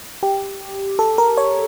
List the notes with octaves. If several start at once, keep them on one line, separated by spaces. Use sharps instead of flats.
G4
A4
A#4
C#5